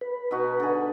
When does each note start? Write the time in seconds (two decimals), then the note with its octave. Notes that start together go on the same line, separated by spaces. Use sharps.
0.01 B4
0.31 B2 D#4 F#4
0.60 D3 G#4